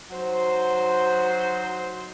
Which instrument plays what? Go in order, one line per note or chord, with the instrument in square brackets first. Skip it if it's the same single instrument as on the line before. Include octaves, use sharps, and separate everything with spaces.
[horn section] F#3 D#4 C5